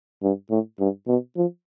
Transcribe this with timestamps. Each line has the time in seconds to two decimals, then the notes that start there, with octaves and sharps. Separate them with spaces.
0.23 G2
0.50 A2
0.80 G2
1.08 B2
1.36 F3